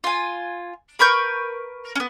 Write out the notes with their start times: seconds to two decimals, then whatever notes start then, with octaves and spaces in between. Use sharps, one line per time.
0.04 F4 G#5
0.99 A#4 B4 C#6 G6
1.95 B3 C#4